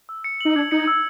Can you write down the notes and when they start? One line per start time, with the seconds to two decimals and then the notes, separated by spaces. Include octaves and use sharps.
0.09 E6
0.24 C#7
0.41 D#4 F#7
0.56 D4 G#6
0.71 D#4 C#7
0.87 E6